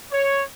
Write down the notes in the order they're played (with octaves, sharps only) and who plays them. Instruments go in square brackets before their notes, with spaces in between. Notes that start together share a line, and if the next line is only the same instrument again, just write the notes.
[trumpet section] C#5